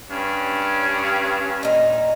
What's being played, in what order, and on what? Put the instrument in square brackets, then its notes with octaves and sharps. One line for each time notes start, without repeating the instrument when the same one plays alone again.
[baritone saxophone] G2 [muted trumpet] C#4
[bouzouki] A#2 D#4